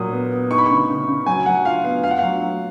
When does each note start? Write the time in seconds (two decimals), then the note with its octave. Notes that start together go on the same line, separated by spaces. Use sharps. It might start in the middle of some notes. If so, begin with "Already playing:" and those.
Already playing: A#2 F#3 D#6
0.12 B3
0.32 B3
0.50 D#4 C#6
0.58 B5
0.66 C#3 C#6
0.89 C#3
1.07 C#3
1.26 F#3 G#5
1.46 F#3 F#5
1.65 F4 F5
1.84 B3 F5
2.03 F4 F5
2.11 F#5
2.19 F#3 F5
2.41 F#3